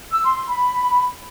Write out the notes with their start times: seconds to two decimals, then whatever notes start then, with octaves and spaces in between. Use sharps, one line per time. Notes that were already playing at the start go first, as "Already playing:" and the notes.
0.12 E6
0.24 C6
0.36 C6
0.48 B5